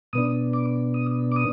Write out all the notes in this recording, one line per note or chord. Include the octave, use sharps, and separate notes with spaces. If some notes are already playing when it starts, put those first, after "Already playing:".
B2 B3 D4 D#6
D6
D#6
D6
D#6